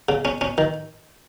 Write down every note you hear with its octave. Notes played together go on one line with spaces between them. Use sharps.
C#3
C#4
C#4
D#3